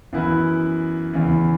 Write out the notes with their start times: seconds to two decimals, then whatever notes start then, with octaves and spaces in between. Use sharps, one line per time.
0.13 F#2 E3 B3 E4 B4
1.13 E2 C#3 E3